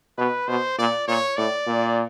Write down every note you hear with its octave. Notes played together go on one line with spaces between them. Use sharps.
B2 B4
B2 C5
A#2 D5
A#2 C#5
A2 D5
A#2